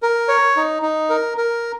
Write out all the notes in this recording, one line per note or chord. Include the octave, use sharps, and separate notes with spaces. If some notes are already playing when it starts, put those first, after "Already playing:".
A#4
C#5
D#4
D#4
A#4
A#4